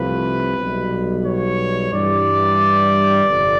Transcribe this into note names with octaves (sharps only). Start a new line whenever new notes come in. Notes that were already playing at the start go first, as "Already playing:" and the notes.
Already playing: C2 C3 F3 A3 B4
B1 B2 G3
C#5
G2 E3 G3 D5
G1 F2 C3